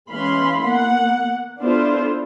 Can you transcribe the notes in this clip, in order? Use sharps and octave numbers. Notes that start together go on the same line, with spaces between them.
E3 G#3 C#4 F5 B5 C6
A#3 B3 F#5
B3 D4 E4 F4 A4 C5